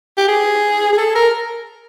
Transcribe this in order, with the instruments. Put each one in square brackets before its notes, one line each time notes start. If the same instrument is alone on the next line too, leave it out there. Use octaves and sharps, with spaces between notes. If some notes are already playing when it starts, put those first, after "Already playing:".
[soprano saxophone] G4
G#4
G#4
A4
A#4